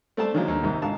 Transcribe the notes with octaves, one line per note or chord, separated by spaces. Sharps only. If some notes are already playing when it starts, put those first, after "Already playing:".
A3 C4 A4 C5 D5 A5
D3 D#3 F3 F#3 G#3 A#3
D#2 D3
C2 G#2 D#3
G#1 D3 F5 A5